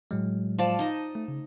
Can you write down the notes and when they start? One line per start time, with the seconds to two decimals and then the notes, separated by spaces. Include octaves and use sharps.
0.11 A2 F#3 G#3
0.59 F3 D5 A5
0.79 D#4 D#5
1.15 A3
1.28 C#3